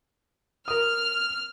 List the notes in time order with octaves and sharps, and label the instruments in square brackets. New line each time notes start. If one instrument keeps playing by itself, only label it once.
[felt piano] A#4 D#6 [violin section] F6